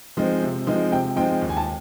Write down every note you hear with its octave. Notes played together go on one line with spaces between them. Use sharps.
F3 G#3 C4 D#4
C3
F3 G#3 C4 D#4
C3 G5
F3 G#3 C4 D#4 G5
D#2
G#5
A5